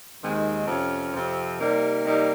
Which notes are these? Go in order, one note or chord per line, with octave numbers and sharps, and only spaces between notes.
D#2 D#3 G#3 C4
F2 C3 F3 C#4
F2 C3 F3 C4
C3 G3 A#3 D#4
C3 G3 A#3 D#4